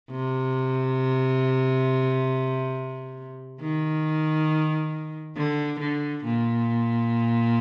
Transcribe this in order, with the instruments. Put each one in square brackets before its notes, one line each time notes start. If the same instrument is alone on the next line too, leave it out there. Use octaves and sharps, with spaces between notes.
[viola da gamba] C3
D#3
D3
D3
A#2